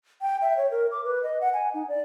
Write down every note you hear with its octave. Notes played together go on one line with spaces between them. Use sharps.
G5
E5
C#5
A#4
D6
B4
D#5
F#5
G#5
D#4
D5